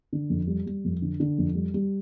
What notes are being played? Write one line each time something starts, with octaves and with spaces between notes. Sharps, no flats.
D3
F2
G3
G3
F2
D3
D3
F2
G3
G3